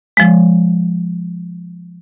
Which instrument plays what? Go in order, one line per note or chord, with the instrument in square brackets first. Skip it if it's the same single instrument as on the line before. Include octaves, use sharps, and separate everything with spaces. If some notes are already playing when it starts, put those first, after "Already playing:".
[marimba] F3 G#3